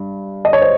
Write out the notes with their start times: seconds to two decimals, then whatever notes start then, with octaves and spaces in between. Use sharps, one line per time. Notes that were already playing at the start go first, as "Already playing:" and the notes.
Already playing: G2
0.45 D#5
0.53 C#5
0.62 C5